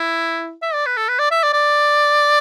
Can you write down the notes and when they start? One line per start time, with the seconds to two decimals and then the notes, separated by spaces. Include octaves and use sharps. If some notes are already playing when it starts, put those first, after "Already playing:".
Already playing: E4
0.62 E5
0.74 D5
0.86 B4
0.97 A4
1.09 B4
1.19 D5
1.31 E5
1.43 D5
1.53 D5